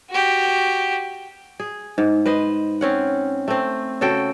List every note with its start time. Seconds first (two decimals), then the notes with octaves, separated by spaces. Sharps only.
0.10 F#4 G4
1.60 G#4
1.98 G#2
2.26 B4 C5 D#5
2.81 C4 C#4 F#5
3.48 A3 C4
4.01 C#3 F#4 A4 G5